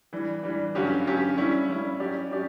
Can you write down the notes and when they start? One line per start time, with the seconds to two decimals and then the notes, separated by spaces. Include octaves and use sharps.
0.13 E3 G3 D4
0.43 E3 G3 D4
0.75 G2 D3 F#3 C#4 G4
1.06 G2 D3 F#3 C#4 G4
1.37 G3 C#4 E4
1.69 G3 C#4 E4
2.00 F#3 C#4 G4 D5
2.31 F#3 C#4 G4 D5